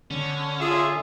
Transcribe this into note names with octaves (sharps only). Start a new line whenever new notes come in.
D3 C#4
F4 G#4 E5